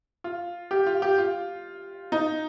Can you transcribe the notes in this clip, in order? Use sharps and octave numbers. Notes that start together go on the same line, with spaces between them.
F4
G4
F4
G4
F4
D#4